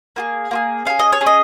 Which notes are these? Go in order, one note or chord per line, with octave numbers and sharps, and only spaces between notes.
A#3 F4 G#4
A#3 F4 G#4
C#4 G#4 F5
D#5
C#5
C#4 G#4
D#5